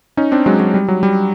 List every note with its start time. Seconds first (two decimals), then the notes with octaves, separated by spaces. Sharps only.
0.17 C#4 D#4
0.32 C4 D4
0.46 F#3 G#3
0.60 F#3
0.74 G3
0.88 F#3
1.03 G3